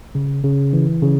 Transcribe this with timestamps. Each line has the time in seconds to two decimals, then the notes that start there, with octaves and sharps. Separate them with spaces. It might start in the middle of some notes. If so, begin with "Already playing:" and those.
0.15 C#3
0.44 C#3
0.73 E3
1.03 C#3